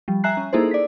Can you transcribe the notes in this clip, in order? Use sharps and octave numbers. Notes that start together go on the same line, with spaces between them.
F3 G3
E5 G#5 A#5 F#6 C7
C#4
A#3 D#4 E4 G#4 A4 C5
D5 B6